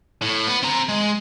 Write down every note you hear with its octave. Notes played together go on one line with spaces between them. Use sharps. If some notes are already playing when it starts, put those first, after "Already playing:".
A2
B3
C4 A#5
G#3